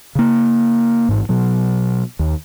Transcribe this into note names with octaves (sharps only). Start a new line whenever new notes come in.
C#3 A#3
A1 G#2
B2 F#3
D#2